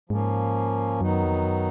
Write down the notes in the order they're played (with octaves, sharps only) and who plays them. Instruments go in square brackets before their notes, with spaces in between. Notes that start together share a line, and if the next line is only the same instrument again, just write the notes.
[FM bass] G#2 [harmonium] F3 A#3 C#4
[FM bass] F#2 [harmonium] D#3 F#3 B3 D#4
[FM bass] F2
F#2